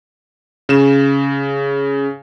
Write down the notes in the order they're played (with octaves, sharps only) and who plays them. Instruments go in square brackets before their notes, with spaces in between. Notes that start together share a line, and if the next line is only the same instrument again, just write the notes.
[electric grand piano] C#3 E7